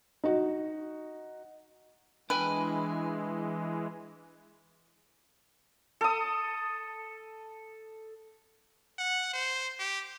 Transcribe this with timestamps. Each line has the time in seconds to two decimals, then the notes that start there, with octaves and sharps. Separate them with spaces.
0.24 D#4 F#4
2.30 E3 G#3 D4 B4 G5 G#5
6.01 A4 D#6
8.98 F#5
9.33 C5
9.79 G4